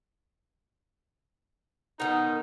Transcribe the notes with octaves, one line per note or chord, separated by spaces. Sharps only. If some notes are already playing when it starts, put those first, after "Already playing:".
B2 D#3 D#4